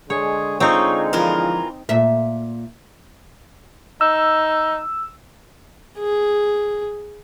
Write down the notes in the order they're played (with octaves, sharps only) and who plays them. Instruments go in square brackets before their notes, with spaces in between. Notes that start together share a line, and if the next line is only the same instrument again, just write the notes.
[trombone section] D3 G#3 [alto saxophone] G#4 [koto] C#5
[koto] C4 D#4 [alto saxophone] F4 [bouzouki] C#5
[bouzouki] E3 F4 A#4 [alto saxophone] F3
[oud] A#2 E5
[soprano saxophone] D#4 [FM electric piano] E6
[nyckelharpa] G#4